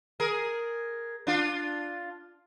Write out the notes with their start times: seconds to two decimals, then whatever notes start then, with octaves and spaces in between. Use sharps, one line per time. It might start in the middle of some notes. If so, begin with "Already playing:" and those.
0.20 G#4 A#4
1.27 D4 F4